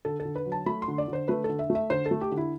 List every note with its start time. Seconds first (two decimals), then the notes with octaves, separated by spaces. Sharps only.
0.05 D3 A4
0.20 A4
0.25 D3
0.36 B4
0.45 F#3
0.52 A5
0.66 A3 B5
0.82 C6
0.88 D3
0.98 D5
1.08 D3
1.13 C5
1.28 A3 B4
1.44 D3 A4
1.59 E5
1.70 A3
1.75 E5
1.90 D3 C5
2.06 A4
2.11 A3
2.21 G4
2.32 D3
2.37 E4